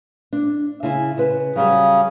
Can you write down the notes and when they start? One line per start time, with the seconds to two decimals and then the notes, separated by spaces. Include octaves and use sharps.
0.33 D4
0.83 C#3 E4 G#5
1.17 C#3 B4
1.56 C#3 F#3 G3